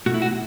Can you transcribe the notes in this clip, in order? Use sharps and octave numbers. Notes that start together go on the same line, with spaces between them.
B2 A3 F#4
E4
F#4